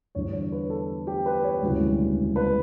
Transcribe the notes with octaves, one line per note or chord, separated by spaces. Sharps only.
E2 D3 G3 D4 C#5
C#5
B4
A4
G4
B4
C#5
E1 D2 C#3 E3 G3
B4